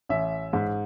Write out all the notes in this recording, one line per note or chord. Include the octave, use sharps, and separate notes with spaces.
A1 E5
G#2